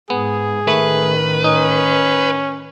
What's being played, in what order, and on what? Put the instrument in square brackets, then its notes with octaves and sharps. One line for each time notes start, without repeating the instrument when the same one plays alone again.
[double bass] G#2 [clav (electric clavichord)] B3 [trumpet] G#4
[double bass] A1 D#3 [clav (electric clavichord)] A3 [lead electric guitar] B4
[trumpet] C#4 [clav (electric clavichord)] D#4